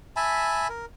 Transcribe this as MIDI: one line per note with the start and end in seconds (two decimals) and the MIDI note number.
0.16 0.68 76
0.16 0.68 80
0.16 0.68 81
0.16 0.68 83
0.69 0.86 70